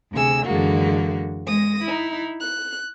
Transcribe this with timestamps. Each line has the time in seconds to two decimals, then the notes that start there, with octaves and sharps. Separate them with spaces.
0.12 D2 C3 G#4 E6
0.45 F#2 D3 E3 G#3 A#3 F#4
1.46 G#3 D#6 A#6
1.83 D#4 E4
2.40 F#6